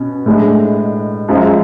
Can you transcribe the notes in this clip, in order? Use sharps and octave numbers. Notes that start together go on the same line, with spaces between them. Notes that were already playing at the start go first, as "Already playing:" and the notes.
Already playing: B2 C#4
A2 G#3 D4
F#2 F3 G#3